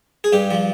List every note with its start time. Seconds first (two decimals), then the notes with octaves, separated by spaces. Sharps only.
0.24 G#4
0.33 G2 G4
0.51 F3